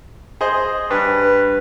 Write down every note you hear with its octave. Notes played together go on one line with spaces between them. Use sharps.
G#4 C5 D#5
G2 B4